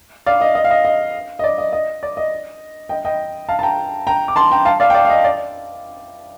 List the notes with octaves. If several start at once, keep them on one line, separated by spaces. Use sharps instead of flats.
D5 F5
D#5
D#5
F5
D#5
D#5
D#5
D5
D#5
D#5
D5
D#5
D#5 G5
D#5 G5
F5 A5
A5
G5 A#5
G5 A#5
D6
A5 C6
G5 A#5
F5 A5
D5 F5
G5
D5 F5
F5
D#5
D5